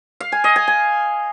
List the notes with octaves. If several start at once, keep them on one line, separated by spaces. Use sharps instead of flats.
F5
G#5
D#5
G#5
G#5